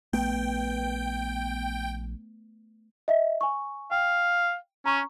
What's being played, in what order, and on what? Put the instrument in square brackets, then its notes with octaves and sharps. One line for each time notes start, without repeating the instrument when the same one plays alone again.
[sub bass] A#1 [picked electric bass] A3 B3 [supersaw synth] G5
[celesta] D#5 E5
G#5 C#6
[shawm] F5 [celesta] G5
[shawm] C#4 [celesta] A#5 C#6